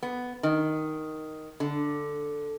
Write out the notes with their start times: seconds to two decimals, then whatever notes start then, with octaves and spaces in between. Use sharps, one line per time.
0.03 B3
0.43 D#3
1.60 D3